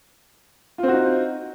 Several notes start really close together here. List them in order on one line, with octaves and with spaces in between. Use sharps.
F4 C4 F#4 D#4